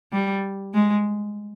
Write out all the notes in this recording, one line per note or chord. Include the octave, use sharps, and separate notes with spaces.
G3
G#3